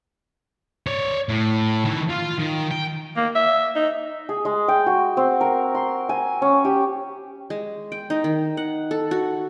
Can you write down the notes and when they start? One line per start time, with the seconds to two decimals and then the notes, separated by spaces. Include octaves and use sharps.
0.87 C#5 D5
1.29 A2
1.84 D#3 E4
2.09 F4 F5
2.39 D#3
2.71 G5
3.16 A#3
3.35 E5
3.76 D#4
4.29 G#4
4.45 G#3
4.68 G5
4.86 F#4
5.17 C4
5.41 A#4
5.75 C6
6.09 G#5
6.42 C#4
6.65 G4
7.50 G#3
7.92 G5
8.10 D#4
8.24 D#3
8.57 F#5
8.91 A4
9.11 F#4